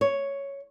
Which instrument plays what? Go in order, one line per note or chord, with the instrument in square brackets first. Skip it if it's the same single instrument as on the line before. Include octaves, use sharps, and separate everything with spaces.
[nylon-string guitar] C#5